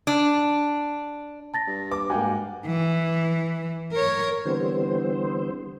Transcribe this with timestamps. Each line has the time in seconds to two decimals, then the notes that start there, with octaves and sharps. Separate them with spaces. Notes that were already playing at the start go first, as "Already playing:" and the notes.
0.07 D4
1.54 A5 A6 A#6
1.67 G2
1.91 B4 D6
2.10 G#2 A#3 F#4 G5 G#5
2.66 E3
3.92 A#4 C#5
4.45 D3 E3 G3 B3 C4 C5